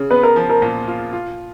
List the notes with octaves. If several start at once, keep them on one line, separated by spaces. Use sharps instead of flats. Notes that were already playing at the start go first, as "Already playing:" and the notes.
Already playing: C#3
B3 B4
A#4
F3
A#4
A#2
F4
F4